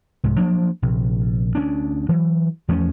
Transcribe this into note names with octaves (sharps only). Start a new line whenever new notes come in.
C2 G#2
F3 F#3 A#3 D4
A#1 C3
D2 A#3 C#4 D4
E3 F#3
E2 F3 A3 C#4